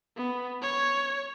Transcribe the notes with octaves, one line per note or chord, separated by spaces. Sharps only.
B3
C#5